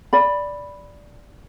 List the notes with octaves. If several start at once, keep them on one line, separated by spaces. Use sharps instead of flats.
D5 B5